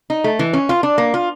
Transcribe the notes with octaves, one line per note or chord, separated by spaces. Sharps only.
D#4
A3
E3
C#4
F4
D4
A#3
F4